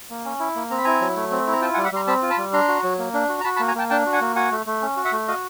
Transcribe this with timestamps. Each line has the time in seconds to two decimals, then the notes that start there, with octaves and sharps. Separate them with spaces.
0.10 A#3
0.25 C#4
0.40 E4
0.55 A#3
0.70 C4 A#5
0.78 B5
0.84 E4 G#5 A#5
1.01 F#3
1.16 A3
1.31 C4
1.47 E4
1.52 A#5
1.61 F4 G5 A5
1.74 F#5 G#5
1.77 G3
1.84 E5 F#5
1.92 G3 A#5 C6
2.07 C4 A5 B5
2.22 F4
2.30 A5 B5
2.38 G3
2.53 D4 A#5 C6
2.68 F#4
2.83 F#3
2.98 A#3
3.14 D4
3.29 F#4
3.41 A#5
3.44 F#4 A5 B5
3.56 A5 B5
3.60 A#3
3.68 G#5 A#5
3.75 A#3 G5 A5
3.90 D4 G5 A5
4.06 F#4
4.13 F#5 G#5
4.21 A#3
4.36 F#4 F#5 G#5
4.51 A3
4.66 A3
4.82 C#4
4.97 F#4
5.05 E5 F#5
5.12 A3
5.28 F#4 D#5 F5